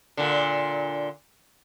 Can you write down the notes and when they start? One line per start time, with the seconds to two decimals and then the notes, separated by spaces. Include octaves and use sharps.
0.17 A#2 D3